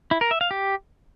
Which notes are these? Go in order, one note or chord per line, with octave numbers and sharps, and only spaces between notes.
E4
A#4
E5
F5
G4